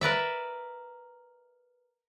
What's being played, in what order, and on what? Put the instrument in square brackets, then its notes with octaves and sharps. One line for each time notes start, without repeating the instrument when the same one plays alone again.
[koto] A#4 B4 D5 E5